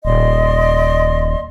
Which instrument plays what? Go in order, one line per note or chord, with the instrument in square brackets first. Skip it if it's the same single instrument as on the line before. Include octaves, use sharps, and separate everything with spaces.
[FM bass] D#1 [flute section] D5 D#5 C6